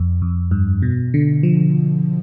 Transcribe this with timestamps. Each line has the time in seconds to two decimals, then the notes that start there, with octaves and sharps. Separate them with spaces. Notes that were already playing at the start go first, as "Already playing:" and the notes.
Already playing: F2
0.22 F2
0.51 G2
0.82 B2
1.14 D3
1.43 F3